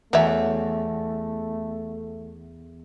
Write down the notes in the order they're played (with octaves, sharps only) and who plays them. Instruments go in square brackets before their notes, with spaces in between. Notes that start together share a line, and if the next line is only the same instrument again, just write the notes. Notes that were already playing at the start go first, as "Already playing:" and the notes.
[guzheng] E2 [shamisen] F#3 C#5 E5 [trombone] A3